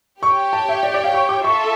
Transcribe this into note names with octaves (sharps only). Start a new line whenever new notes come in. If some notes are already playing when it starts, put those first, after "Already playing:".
G4 C#5 G5 C#6
A5
E5
D5
D5
F5
C#6
D6
F4 A4 E5 C#6